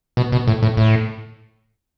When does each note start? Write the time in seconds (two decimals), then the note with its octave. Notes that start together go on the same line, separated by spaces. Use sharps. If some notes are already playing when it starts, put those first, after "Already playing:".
0.17 B2
0.32 B2
0.48 A2
0.63 A2
0.77 A2